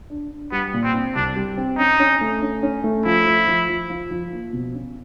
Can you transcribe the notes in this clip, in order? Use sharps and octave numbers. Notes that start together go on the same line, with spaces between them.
D4
D4
G3 B3
A#2
C4
C4
C2 D4
G3
C4
C#4 D#4
C#4
A3
C#4
C#4
A3
F3 E4
F3
F3
F3
F3
F3
A#3
B2
C#4